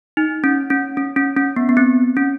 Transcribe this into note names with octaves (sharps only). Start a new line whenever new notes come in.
D#4
C#4
C#4
C#4
C#4
C#4
B3
B3
C4
C#4